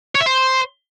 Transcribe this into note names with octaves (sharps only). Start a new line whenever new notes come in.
C#5
E5
C5